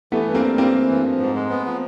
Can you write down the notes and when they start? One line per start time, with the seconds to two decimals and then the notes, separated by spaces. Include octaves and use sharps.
0.12 E3 A3 B3
0.28 G2
0.34 A#3 C4
0.43 G3
0.58 G2 A#3 C4
0.74 E3
0.89 G2
1.05 F3
1.20 G#2
1.35 G#3
1.50 B3
1.66 F3